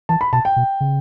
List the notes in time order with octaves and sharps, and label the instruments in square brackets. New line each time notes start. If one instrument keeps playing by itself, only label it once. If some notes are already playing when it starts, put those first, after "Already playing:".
[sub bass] E3 [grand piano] A5
[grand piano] B5
[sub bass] B2 [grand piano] A5
[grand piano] G5
[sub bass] B2
C#3